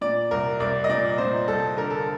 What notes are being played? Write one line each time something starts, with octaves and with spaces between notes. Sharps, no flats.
A#2 D5
C2 A#4
C2 D5
D#5
A#2 D5
A#2 C5
C2 A4
D3 A#4
A4